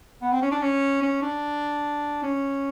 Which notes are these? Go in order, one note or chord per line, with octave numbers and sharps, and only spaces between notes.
B3
C4
C#4
D4
C#4
C#4
D4
C#4